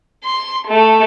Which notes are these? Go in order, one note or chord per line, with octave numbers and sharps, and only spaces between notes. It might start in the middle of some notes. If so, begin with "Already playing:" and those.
C6
A3